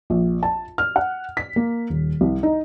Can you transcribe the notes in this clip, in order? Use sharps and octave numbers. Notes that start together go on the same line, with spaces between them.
A#1
A5
F6
F#5
B6
A#3
D#1
C2
D#4